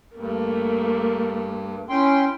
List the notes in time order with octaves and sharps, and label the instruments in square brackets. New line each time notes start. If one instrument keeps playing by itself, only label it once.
[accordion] G2 [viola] A3 A#3
[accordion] C#4 G5 C6 [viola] E4